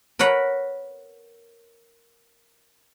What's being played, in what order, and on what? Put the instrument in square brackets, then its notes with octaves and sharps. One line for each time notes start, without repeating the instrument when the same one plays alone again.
[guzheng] A#4 B4 C#5 F#5 B5